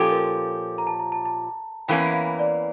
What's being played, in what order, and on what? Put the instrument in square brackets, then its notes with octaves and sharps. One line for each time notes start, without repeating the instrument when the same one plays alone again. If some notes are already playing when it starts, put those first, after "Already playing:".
Already playing: [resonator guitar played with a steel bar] A#2 F3 C#4 G4 [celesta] A4
[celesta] A#4
A#5
A5
A#5
A5
A5
[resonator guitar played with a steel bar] E2 E3 A#3 C#4 [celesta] G5
[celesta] F5
D5